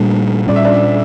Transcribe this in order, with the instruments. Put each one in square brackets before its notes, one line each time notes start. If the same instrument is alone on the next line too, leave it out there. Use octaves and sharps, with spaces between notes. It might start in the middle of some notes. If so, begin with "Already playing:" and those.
Already playing: [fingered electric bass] A#2 G3 A#3 D4 [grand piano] A3
[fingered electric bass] A#2 G3 C#4 [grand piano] D5
[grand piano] E5
D4 D5